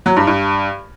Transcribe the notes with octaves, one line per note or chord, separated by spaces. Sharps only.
F#3
G2
G2